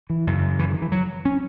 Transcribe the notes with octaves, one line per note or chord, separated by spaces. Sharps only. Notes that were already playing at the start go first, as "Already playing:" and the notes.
E3
F#2 C#3
E3
D#3
E3
F#3
C#4